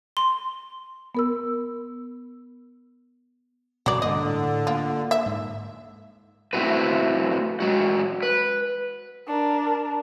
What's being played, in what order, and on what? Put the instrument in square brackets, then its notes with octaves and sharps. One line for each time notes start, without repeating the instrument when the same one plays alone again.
[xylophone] C6
[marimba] B3 A#4 E6
[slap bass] F#2 B2 [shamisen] F#3 D5
[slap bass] G2 A#3 [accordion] D3 [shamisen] D#5
[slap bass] A2
[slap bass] A#3 [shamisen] F4
[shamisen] E5
[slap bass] G#2
[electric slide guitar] A3 C4 E4 F#4 B4
F#3 G#3 F#4
B4
[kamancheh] D4 A#4